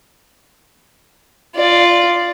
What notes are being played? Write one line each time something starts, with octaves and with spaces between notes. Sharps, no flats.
F4 D5